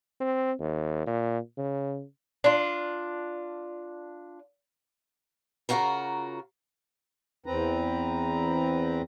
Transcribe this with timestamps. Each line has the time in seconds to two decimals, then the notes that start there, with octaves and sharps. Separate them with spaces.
0.20 C4
0.59 D#2
1.07 A#2
1.58 C#3
2.44 D4 F4
5.69 C#3 F4 F#4 A#4 A#5
7.46 E2 C4 B4 A#5